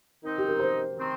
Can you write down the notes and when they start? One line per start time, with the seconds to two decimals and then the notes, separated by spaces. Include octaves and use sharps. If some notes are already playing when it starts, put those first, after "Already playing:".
0.24 D#3 C4 D#4
0.38 G4
0.49 A#4
0.59 C5
0.97 D#3 C4